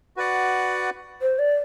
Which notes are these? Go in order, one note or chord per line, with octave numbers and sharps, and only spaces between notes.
F#4 B4 D5 F#5
C5
D5